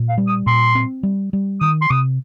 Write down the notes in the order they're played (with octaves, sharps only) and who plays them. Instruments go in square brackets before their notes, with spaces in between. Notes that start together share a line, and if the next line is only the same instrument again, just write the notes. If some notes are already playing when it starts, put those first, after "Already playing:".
Already playing: [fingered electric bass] A#2
[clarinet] F5
[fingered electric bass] G3
[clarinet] D#6
[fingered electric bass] A#2 [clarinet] C6
[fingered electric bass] C4
G3
G3
[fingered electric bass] D#3 [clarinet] D#6
[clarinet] C6
[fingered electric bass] C3 [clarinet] D#6